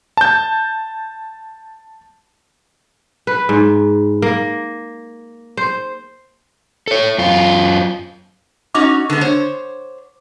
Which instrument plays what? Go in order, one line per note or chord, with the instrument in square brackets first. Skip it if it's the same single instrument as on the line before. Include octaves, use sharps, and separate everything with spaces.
[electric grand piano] A5 G6
[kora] B4
G#2
A#3
C5
[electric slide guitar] A4 C#5
F#2 F4
[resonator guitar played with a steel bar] C#4 D#4 F#4 [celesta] D6
[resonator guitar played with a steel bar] D3 G#3 B3
C5 C#5